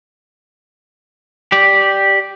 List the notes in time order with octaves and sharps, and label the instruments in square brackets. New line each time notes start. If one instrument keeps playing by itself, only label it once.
[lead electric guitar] G4 D5